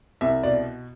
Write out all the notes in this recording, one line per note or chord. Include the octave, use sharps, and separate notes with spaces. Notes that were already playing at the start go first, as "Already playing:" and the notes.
C2 E5
B2 D5